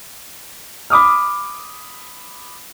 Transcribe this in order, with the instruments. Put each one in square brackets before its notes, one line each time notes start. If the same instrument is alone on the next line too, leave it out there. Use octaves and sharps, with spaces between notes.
[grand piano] B5 D6 D#6 F6